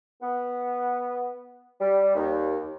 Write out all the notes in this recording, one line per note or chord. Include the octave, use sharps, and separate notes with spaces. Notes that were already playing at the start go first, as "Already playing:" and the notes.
B3
G3
D#2